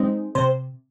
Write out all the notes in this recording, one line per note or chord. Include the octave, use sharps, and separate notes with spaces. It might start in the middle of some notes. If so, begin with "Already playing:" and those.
Already playing: G#3 C4 D#4
C3 C5